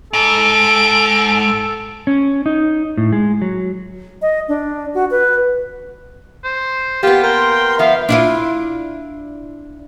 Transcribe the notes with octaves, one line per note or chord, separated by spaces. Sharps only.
G#2 A4 D7
C#4
D#4
A2
G#3
F#3
D#5
D4
F#4
B4
C5
A#3 B3 F4 G4
A#4 G5 C6
G5
F3 B3 E5 F5
D4 E4 F4